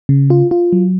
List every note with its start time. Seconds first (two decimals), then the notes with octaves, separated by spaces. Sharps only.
0.09 C#3
0.30 F4
0.51 F4
0.73 F#3